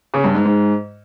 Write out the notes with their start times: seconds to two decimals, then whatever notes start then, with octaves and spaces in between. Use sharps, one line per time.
0.14 C#3
0.24 G2
0.35 G#2
0.45 G#2